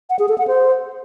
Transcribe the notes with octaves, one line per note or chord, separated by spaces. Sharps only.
F#5
G#4
A4
F#5
C5